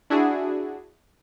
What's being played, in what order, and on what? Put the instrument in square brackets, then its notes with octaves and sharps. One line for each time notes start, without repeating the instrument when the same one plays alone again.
[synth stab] D4 E4 F#4 G#4